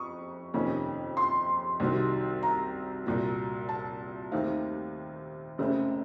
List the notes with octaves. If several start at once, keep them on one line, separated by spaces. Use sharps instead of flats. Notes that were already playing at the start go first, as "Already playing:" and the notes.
Already playing: F2 C#6 D#6
F2 C3 D#3 A#3 C#4
C6
C2 C3 D#3 F#3
A#5
C2 A#2 F#3
A5
D#2 D#3 A3 C4 D#4 F5
F#1 F#2 C#3 A3 C4